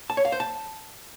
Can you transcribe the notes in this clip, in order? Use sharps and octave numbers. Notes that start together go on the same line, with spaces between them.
A5
C#5
F5
C5
A5